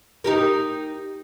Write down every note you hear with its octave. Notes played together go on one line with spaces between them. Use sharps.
D#4 G4 A#4